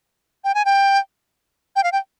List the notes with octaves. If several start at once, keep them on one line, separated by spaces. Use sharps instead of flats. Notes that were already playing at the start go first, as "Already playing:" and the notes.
G5
G#5
G5
G5
F5
G5